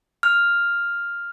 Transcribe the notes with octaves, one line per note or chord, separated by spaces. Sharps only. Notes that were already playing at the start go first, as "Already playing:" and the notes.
F6